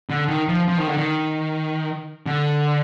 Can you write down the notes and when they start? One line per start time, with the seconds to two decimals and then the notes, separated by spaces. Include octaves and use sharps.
0.10 D3
0.28 D#3
0.48 F3
0.68 F3
0.78 D#3
0.87 D3
0.97 D#3
2.26 D3